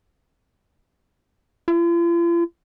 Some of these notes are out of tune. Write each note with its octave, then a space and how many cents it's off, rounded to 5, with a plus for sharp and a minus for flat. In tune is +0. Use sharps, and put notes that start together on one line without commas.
F4 -45